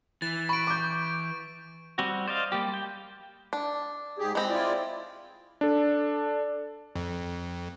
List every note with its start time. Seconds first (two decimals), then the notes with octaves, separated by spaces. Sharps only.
0.22 E3 A6
0.49 B5 C#6 D7
0.67 D6 G6
1.98 G3 C4 F#4
2.27 C5 D5 D#5 F5
2.52 G3 A#3 G4
2.74 G5
3.53 D4
4.19 G#2 G4 G#4
4.35 G#3 C4 A#5 B5
4.50 E4 F4 D5
5.61 D4 A4
6.96 F2